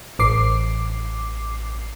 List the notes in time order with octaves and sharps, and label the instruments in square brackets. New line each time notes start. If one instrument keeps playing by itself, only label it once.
[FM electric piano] A1 D6 C7